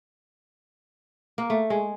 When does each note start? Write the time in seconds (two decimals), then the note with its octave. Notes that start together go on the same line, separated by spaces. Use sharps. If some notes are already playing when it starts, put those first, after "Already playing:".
1.38 A#3
1.50 A3
1.70 G#3